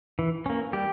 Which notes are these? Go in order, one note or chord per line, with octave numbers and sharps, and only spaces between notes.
E3
A#3 C#4
G3 G4